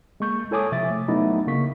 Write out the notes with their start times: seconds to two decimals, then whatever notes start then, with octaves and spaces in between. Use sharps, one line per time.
0.20 G#3 A#3 C#6 G6
0.51 E4 A4 C#5 G#5 D6 D#6
0.72 C3 F3 E5 D6 A6
0.90 A3
1.08 F#3 A3 B3 D#4 E4 D#5
1.47 C#3 A#3 C#6 B6